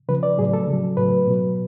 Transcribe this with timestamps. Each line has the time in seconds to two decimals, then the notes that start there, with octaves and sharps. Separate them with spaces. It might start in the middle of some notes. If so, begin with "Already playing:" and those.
0.09 C#3 F3 B4
0.23 D5
0.38 A2 F#3 G#4
0.53 A4
0.68 C#3 F#3
0.97 A2 F#3 B4
1.27 B2 F#3